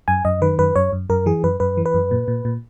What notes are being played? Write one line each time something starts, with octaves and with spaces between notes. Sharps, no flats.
F#2 G#5
F#2 D#5
D#3 B4
F#2 B4
F#2 C#5
F#2
F#2 A#4
E3 G#4
F#2 B4
F#2 B4
E3
B4
F#2
A#2
A#2
A#2